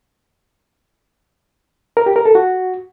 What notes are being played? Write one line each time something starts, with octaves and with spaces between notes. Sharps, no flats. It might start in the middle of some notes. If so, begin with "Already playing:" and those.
A#4
G4
A#4
A4
F#4